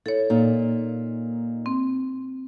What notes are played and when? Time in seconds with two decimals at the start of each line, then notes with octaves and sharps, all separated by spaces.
0.06 E4 A4 C#5
0.30 A#2 A#3 D#4
1.66 C4